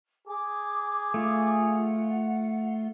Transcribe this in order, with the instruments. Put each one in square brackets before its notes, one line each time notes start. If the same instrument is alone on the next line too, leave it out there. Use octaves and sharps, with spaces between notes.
[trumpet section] G#4 [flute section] D6
[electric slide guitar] A3 F4
[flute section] F#5